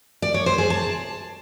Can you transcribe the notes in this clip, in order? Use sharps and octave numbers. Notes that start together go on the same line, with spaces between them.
D5
C#5
C5
G#4
A5